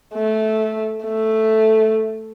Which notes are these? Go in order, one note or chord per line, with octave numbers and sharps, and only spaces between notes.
A3
A3